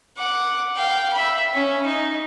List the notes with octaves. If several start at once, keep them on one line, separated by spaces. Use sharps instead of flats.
F#5 D6
F5 G5
E5 B5
C#4
D#4